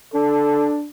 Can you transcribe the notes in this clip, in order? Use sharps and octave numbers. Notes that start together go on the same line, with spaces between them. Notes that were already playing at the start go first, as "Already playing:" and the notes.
D4 A4